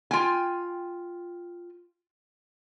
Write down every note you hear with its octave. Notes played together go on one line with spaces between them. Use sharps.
F4 G5 G#5